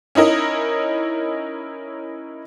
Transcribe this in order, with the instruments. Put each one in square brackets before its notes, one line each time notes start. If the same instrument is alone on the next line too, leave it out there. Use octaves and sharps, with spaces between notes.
[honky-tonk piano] C#4 D#4 E4 A#4 D#5